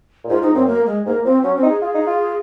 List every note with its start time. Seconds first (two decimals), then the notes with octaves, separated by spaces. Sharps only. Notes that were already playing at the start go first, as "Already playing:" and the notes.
0.24 A#2
0.29 G#2 F4
0.42 G#2 D#4
0.54 F#2 C4
0.67 A#3
0.86 G#3
1.06 G#2 A#3
1.25 F3 C4
1.43 F#3 C#4
1.56 C4
1.63 D#4
1.69 G#4
1.81 F4 G#4
1.95 D#4
2.07 F4